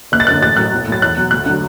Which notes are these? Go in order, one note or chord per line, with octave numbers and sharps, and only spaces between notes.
F#1 F#6
A6
F#2 D3 F#6
A1 A6
A2 F#3 F#6
B1
A2 F#3 A6
E2 F#6
B2 F#3
D2 F#6
D3 F#3